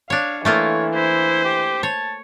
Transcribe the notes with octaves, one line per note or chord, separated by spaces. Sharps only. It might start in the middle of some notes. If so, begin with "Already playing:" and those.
D4 C#5 F5
E3 A3 A#3 F4 C#5
E4 C5
G4
C#5 A5